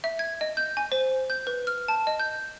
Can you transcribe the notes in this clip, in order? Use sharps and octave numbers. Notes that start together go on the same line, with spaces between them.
E5
G#6
D#5
G6
G#5
C5
G6
B4
F6
A5
D#5
G6